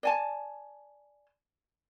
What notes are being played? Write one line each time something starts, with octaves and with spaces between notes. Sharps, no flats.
D5 G#5 A5